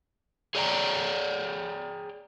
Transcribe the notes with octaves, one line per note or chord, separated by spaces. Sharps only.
G#4 C#5 D5 F5 G5 A#5